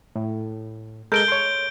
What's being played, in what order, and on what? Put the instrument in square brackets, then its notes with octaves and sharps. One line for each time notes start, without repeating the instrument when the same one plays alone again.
[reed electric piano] A2
[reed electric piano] G#3 A4 A#4 [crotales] G6 D7 G7
[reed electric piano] C#5 C6